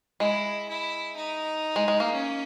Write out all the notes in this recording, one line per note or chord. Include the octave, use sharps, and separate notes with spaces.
G#3 E4
E4
D#4
G#3
G#3
A#3
C#4